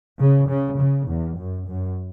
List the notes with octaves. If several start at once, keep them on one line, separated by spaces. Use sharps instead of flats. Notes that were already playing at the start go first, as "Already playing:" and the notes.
C#3
C#3
C#3
E2
F#2
F#2